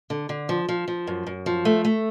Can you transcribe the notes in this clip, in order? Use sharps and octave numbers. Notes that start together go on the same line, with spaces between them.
D3
D3
F3
F3
F3
F#2
F#2
F3
A3
A3